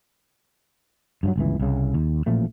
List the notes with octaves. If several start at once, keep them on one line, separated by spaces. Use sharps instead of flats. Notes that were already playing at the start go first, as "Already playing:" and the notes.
G2 F3 F#3
G1 C#2 E3
C2 C#3
D#2
A1 A#2 F3 A3